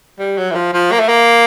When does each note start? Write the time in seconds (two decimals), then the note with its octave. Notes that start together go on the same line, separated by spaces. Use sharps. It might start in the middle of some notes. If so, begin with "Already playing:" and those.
0.19 G3
0.37 F#3
0.51 E3
0.55 F3
0.73 F3
0.92 A#3
1.00 A3
1.09 A#3